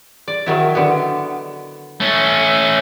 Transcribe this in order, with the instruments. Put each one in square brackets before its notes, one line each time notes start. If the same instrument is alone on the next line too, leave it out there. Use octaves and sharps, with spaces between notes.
[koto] D5
D#3 F#3 E4
D3 B3
[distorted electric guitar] A3 C#4